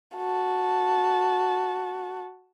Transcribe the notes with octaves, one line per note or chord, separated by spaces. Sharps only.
F#4 A5